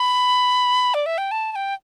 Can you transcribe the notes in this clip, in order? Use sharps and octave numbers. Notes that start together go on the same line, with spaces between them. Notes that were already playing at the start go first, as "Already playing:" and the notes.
Already playing: B5
D5
E5
G5
A5
A5
G5